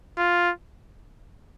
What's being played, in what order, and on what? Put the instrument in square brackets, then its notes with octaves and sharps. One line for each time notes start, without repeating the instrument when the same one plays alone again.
[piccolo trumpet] F4